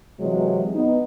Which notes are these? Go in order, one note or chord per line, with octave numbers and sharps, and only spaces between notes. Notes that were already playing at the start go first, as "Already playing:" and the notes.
C3 E3 F#3 G#3
B3 D#4